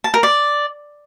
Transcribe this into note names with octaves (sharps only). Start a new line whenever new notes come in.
A5
A#4
D5